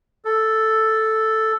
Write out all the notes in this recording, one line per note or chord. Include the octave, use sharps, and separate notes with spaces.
A4